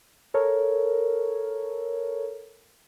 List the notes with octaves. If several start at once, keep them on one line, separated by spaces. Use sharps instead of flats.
A4 A#4 C#5